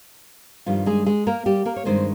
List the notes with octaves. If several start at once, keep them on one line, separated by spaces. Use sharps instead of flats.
G2 D#3 F3 G3 F4
G#3 G#4
G#3 G#4
A#3 A#4
G3 G4
A#3 A#4
C#5
G2 D#3 G#3 C4 C5